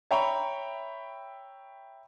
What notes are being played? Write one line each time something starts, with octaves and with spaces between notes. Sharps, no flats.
C#5 E5 G5 A#5 B5 C#6